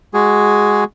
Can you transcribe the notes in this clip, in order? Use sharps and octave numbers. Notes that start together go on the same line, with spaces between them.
G#3 F#4 G#4